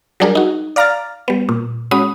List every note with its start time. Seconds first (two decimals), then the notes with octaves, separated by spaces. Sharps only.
0.20 F#3 G3 D4 G#4 A#4
0.35 D#4 F#4
0.76 D5 F5 A#5 D6 F6 A6
1.28 G3 B3
1.49 A#2
1.91 G#3 C#4 F#4 B5 D#6